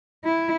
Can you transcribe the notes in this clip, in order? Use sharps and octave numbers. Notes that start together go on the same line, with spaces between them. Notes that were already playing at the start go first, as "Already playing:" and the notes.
E4